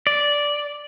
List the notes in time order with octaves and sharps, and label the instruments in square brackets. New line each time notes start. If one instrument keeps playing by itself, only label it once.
[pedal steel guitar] D5